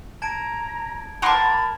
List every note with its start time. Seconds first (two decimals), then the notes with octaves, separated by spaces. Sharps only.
0.22 A5 A#5 G#6 D7
1.22 A#4 F#5 A5 B5 C6 D6 G#6